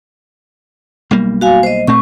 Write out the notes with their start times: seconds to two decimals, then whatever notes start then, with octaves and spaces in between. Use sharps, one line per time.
1.11 B1 G3 A#3
1.41 F#4 F5 G#5
1.63 C5 D#5
1.87 A#2 A3 C4 C#6